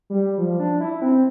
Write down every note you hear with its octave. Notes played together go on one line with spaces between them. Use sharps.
G3
F3
D4
E4
C4